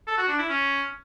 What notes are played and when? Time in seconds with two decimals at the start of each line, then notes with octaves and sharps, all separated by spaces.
0.07 A4
0.17 F#4
0.28 D4
0.38 E4
0.49 C#4